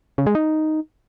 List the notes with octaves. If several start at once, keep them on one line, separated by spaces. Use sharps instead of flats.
C#3
G#3
D#4